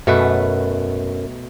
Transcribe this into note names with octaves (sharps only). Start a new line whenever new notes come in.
F#2 B2 A3 B4